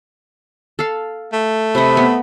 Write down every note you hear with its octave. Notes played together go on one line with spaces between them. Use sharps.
A4 F5
A3
C3 D#5 B5
B3